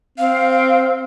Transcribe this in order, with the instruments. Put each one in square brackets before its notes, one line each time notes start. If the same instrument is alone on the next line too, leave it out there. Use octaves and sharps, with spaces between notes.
[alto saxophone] C4 [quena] F5